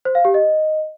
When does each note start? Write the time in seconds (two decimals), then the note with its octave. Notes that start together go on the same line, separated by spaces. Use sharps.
0.05 C5
0.15 F5
0.25 G4
0.34 D#5